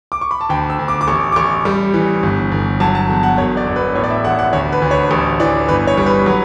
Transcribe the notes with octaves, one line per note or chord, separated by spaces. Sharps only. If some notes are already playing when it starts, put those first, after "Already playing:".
D6
C#6
B5
A5
D2 G5
E6
D2
D6
D6
A1 C#6
D6
A1 C#6
G3
E3
G1
G1
F#3 A5
A5
E2
F#5
E1 C#5
D5
E1
B4
A2 C#5
D5
E5
A1 F#5
F#5
D2 C#5
B4
D2
C#5
A1
E3 D5
G1 B4
C#5
G3
B4
F#3